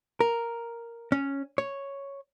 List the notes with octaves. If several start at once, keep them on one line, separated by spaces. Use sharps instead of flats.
A#4
C#4
C#5